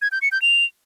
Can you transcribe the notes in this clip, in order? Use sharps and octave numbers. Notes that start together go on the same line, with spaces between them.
G#6
G6
C#7
G6
F7